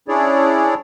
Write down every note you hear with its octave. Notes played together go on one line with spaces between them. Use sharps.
C#4 D4 E4 G#4 C#5 D5